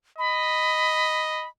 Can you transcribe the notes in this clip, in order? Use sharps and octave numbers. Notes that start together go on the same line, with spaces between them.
D#5 B5